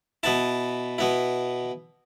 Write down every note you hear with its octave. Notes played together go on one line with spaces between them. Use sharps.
B2 B3 E4 A5
B2 B3 E4